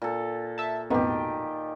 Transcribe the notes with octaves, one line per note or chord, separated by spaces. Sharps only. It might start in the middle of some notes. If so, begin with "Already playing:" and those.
A#2 A4
E5 A5
A1 F2 B2 D#3 G4